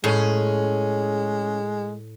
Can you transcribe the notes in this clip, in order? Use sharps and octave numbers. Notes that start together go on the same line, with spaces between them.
A2 G#3 C#4 G#4